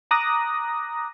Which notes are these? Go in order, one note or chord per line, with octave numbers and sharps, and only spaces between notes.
A#5 D6 D#6 F#6 A#6